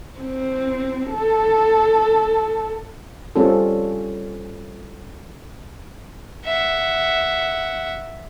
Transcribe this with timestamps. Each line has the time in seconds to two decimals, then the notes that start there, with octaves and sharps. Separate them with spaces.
0.19 C4
1.11 A4
3.36 G3 C4 C#4 F4 A4
6.45 E5 F#5